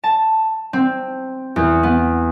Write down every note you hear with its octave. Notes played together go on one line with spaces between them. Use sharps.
A5
C4
E2
B3